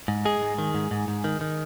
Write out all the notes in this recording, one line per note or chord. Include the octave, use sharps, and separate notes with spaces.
G#2
G#3 G#4
G#2
D#3
G#2
G#2
G#2
D#3
D#3